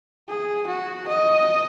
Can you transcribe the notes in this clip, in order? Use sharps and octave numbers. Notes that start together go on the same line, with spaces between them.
G#4
F#4
D#5